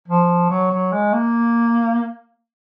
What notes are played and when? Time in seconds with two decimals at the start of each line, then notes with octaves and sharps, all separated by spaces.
0.08 F3
0.50 F#3
0.71 F#3
0.92 G#3
1.13 A#3